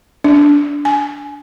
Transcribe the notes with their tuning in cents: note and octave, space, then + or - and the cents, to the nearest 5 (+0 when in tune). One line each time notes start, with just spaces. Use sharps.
D4 -15
G#5 +20